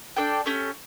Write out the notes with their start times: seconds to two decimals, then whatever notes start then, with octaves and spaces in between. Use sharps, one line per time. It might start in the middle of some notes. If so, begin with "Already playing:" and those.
0.16 D4 A4 D5 G5
0.46 A3 C#4 G4